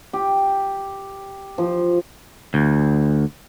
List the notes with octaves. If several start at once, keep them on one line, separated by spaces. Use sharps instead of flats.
G4
F3
D2